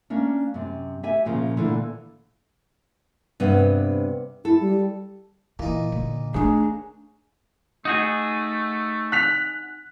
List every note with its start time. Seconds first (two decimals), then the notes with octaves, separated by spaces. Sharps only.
0.10 A#3 C#4 D4
0.54 F#2 C3
1.03 G4 E5 G#5
1.25 A#2 C#3 F3 A#3
1.57 A#2 D3 E3
3.40 G2 C3 B3
4.45 E4 A4
4.61 G3
5.59 A#2 E3 A#3 D#4
5.92 D3
6.34 A3 D4 D#4 G#4 C#5 A#5
7.85 A3 D#4 F#4 G#4
9.12 F#6 B6 F7